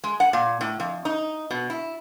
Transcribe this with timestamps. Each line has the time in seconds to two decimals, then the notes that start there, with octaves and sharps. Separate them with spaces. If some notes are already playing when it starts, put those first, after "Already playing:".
0.04 G#3
0.20 F#5
0.33 A#2
0.61 A2
0.80 F2
1.05 D#4
1.51 B2
1.70 E4